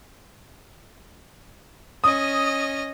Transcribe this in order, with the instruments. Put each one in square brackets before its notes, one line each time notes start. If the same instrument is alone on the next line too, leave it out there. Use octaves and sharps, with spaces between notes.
[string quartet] C#4 D#5 [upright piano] D#6